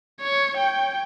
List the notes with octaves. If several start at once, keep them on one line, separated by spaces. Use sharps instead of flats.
C#5
G5